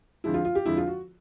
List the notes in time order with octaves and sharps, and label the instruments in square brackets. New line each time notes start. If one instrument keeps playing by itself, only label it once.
[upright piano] F2 D3 F3 G#3 E4
F4
F4
G4
F2 D3 F3 G#3 E4
F4
F#4